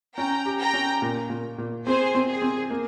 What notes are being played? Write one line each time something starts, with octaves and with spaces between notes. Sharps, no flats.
C#4 G5 A#5
G4
G5 A#5
C#4
A#2
A#2
A#2
C4 G#4 C5
C4
G#4
C4
A#3